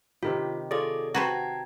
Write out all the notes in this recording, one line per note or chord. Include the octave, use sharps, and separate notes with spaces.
C3 D#3 F4 G4
F4 G#4 A4 C#5 D5 D6
F#4 B4 C5 F#5 G5 A5 A#5 G#6